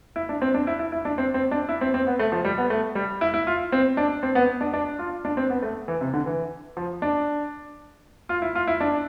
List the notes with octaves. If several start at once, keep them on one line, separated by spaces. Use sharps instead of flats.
E4
D4
C4
D4
E4
E4
E4
D4
C4
C4
D4
E4
C4
C4
B3
A3
F3
G3
B3
A3
G3
E4
E4
F4
C4
D4
C4
B3
D4
D4
F4
D4
C4
B3
A3
E3
C3
D3
E3
F3
D4
F4
E4
F4
E4
D4